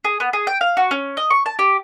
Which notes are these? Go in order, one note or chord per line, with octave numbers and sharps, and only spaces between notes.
G#4
B3
G#4
G5
F5
F#4
C#4
D#5
C#6
A5
G4